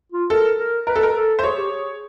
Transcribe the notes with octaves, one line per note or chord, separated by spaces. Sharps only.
F4
A4 A#4
A#4
A#4 B4
A4
A#4
A4
C5
G#4 C#5
G4
G#4